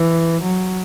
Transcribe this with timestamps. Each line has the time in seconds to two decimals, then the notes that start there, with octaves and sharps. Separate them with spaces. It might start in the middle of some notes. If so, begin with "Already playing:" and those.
Already playing: E3
0.42 F#3